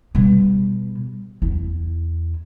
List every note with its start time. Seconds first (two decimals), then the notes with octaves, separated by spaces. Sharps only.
0.15 B2 G3
1.42 E2 E4